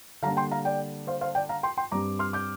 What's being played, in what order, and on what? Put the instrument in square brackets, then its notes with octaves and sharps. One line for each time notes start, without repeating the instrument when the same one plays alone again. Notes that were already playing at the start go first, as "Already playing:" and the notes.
[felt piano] D3 G3 A#3 D4 F5 A#5
G5 C6
F5 A#5
D5 G5
C5 F5
C5 F5
D5 G5
F5 A#5
G5 C6
G5 C6
G2 G3 C4 A#5 D6
C6 F6
D6 G6